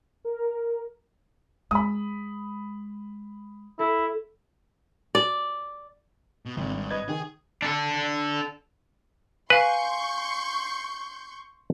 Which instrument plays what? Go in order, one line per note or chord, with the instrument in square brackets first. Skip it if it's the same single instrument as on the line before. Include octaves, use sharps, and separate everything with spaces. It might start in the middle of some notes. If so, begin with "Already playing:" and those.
[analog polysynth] A#4
[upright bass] G#3 [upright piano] B5 D#6
[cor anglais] E4 [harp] A4
[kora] D5
[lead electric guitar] B2
[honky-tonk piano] G#1 [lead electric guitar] F#2 C3
[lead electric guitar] G2
[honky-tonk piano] B4 D#5 G#6
[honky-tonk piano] D#3 [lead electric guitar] G#4
[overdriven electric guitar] D4 A4
[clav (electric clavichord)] B4 [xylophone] F5 G#5 [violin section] C6 C#6 G6